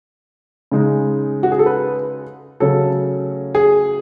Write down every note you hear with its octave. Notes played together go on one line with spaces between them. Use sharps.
C#3 G#3 D#4
F#4
G#4
A4
B4
C#3 F#3 A3 C#4 A4
G#4